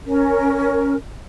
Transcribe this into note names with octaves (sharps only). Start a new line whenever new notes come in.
C#4 A#4